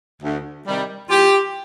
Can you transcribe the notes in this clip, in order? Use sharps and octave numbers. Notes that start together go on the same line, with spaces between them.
D2
C3 D#3 G3
E2 F4 G4